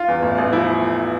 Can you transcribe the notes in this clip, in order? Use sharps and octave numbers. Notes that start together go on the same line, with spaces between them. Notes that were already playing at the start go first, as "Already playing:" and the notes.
Already playing: F4
E2
A1
A1
F3 E4